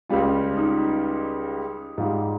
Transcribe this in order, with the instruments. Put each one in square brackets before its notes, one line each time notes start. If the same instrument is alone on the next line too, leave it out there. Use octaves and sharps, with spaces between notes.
[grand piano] C#2 C#3 G3 F4
D#4
G#2 G3 F4